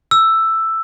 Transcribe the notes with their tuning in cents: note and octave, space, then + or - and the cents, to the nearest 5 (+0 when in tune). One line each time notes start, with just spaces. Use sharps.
E6 +5